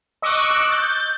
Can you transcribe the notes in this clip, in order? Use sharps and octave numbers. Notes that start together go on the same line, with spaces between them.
D#5 C#6 D6 E6 F#6
G6 A6